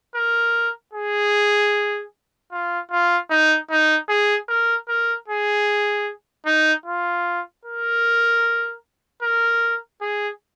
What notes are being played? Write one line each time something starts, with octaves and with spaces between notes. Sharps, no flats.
A#4
G#4
F4
F4
D#4
D#4
G#4
A#4
A#4
G#4
D#4
F4
A#4
A#4
G#4